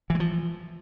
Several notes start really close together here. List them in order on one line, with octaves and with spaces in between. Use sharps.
E3 G#3 F3